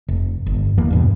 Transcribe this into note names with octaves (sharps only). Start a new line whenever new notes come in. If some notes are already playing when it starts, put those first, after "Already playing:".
F1
G1
E2 E3 A#3
E2 G2 B2